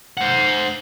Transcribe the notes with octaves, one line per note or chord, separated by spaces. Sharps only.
C5 F#5